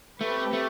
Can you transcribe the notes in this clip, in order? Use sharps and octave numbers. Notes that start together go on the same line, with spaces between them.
A3 C4 G4 B4
A3